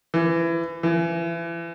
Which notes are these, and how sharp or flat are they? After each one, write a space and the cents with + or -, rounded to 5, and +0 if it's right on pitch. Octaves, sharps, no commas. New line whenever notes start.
E3 +25
E3 +35